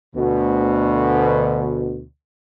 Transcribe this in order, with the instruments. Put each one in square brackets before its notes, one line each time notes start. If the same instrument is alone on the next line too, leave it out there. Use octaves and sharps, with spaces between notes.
[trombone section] D2 B2